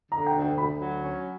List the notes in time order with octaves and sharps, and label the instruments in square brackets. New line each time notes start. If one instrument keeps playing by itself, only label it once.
[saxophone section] D3 [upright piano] A#5
[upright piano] G5
[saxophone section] D2
[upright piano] G5
[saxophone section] D2 [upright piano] B5
[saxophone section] F#3
C#4